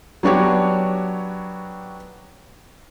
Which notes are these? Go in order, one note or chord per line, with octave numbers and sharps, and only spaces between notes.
F#3 B3 D4 F#4 G4 C#5